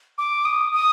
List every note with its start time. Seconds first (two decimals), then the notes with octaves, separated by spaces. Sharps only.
0.18 D6
0.45 D#6
0.72 D#6